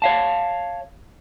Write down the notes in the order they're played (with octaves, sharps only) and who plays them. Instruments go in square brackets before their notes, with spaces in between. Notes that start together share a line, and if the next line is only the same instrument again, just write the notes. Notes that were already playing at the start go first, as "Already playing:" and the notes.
[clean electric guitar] C#5 F5 A5